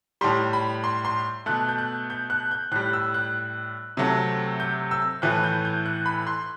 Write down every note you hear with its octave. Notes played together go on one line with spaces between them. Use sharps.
A2 G3 C6
B5
C6
C6
B2 A3 F#6
G6
F#6
G6
F#6
G6
A2 G3 F#6
E6
F#6
C3 F#3 A3
G6
E6
A2 E3 A3 F#6
G6
G6
F#6
B5
C6